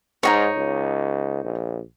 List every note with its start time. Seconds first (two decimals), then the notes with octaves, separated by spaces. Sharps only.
0.23 G#2 D#4 F#4 C#5
0.57 C#2
1.44 A#1